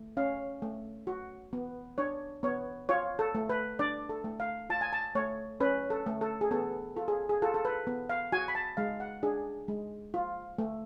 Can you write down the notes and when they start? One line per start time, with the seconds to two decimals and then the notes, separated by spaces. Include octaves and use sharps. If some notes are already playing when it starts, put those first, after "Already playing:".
Already playing: A3
0.17 C#4 F5
0.62 A3
1.07 F#4
1.53 B3
1.98 D4 C#5
2.43 B3 C#5
2.89 F4 C#5
3.19 A4
3.35 A3
3.49 B4
3.79 D4 D5
4.09 A4
4.24 A3
4.40 F5
4.70 F4 A5
4.81 G#5
4.93 A5
5.15 A3 C#5
5.60 C#4 B4
5.90 A4
6.06 A3
6.21 A4
6.41 G#4
6.51 B3 A4
6.96 F4 A4
7.08 G#4
7.29 G#4
7.42 F4 A4
7.54 A4
7.65 B4
7.87 B3
8.10 F5
8.32 F#4 G#5
8.48 B5
8.55 A5
8.77 G#3 F5
9.00 F#5
9.23 D4 G#4
9.68 G#3
10.14 F4
10.58 A3